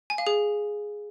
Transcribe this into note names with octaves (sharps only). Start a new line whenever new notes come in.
G#5
F5
G#4